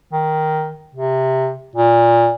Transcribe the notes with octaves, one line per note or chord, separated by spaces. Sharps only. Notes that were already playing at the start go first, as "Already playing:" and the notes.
D#3
C3
A#2